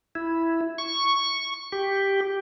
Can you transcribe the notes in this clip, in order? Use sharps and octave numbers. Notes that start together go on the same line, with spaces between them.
E4
C#6
G4